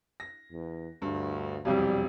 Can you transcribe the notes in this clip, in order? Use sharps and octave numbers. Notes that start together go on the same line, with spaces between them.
A#6
E2
D2 G2
E1 C2 F2 G3